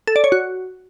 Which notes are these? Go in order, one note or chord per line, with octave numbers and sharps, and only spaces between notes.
A4
D5
C#5
F#4